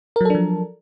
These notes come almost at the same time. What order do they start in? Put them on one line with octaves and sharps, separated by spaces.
A#4 F#3 A4 D4 F3